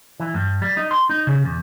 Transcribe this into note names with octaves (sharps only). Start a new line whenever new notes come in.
E3
G2
G3
D#4
C6
D#4
C#3
E2